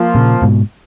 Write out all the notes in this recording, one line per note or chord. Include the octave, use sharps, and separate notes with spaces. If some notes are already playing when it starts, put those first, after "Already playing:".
Already playing: F3 A#3 F4
A#2 C#3
G#2 B2